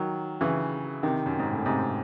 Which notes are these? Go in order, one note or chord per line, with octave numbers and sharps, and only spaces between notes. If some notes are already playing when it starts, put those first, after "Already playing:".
Already playing: D#3 F#3
C#3 E3
C3 D#3
F#2
G#2
A2
G#2 C3